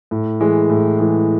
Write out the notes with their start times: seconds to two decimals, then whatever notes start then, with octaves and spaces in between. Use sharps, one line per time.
0.11 A2
0.40 E3 G#3
0.70 A2
0.99 E3 G#3